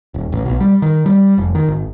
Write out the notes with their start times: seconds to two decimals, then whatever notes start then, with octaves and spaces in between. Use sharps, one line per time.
0.14 D#1
0.32 A1
0.46 B1
0.60 G3
0.82 D#3
1.06 G3
1.38 F1
1.55 D#3
1.68 G#1